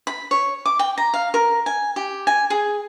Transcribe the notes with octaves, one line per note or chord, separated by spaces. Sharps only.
B5
C#5
D6
G5
A#5
F5
A#4
G#5
G4
G#5
G#4